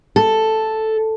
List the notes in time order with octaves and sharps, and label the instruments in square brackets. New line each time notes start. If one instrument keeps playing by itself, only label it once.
[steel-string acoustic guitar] A4